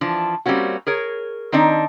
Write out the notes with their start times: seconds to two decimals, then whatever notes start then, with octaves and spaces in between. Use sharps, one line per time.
0.01 E3 F3 D4
0.46 G3 A#3 C4 C#4 F#4
0.87 G#4 A#4 C#5
1.52 D#3 C4 D4 D#4